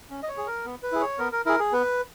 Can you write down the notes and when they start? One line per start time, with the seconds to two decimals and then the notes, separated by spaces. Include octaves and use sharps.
0.10 C#4
0.23 D#5
0.28 C#5
0.37 G#4
0.47 A#4
0.65 B3
0.83 B4
0.92 E4 G#4
1.00 C#5
1.19 B3 A#4
1.32 A#4
1.45 E4 G#4 A#4
1.59 G#4
1.72 B3 B4